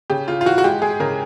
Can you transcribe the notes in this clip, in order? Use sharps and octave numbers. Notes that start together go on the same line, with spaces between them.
C#3 G4
C#3 F4
F4
E3 F#4
F#4
G#3 G4
G#3 G#4
C#3 A#4